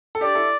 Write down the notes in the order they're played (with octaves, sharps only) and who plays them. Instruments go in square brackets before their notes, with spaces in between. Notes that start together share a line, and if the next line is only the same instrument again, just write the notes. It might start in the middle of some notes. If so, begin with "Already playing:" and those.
[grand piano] A4
[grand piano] D4 G4 [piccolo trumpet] D5
[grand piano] E4 A4